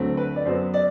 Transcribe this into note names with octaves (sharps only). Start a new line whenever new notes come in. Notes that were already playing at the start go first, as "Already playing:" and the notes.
Already playing: D2 D3 F#3 A3 C4
B4
D5
F#2 F#3 B3 C5
D5